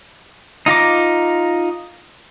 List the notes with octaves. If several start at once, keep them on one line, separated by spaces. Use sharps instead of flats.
D#4 F4 A#5 D6